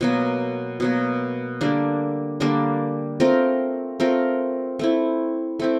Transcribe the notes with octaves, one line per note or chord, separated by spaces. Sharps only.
B2 F#3 A#3
B2 F#3 A#3
D3 G3 A#3 D4
D3 G3 A#3 D4
A3 C4 F4 A#4
A3 C4 F4 A#4
A3 C4 E4
A3 C4 E4